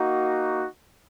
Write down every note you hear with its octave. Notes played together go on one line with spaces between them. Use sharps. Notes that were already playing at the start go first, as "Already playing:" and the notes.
Already playing: A#3 D#4 F#4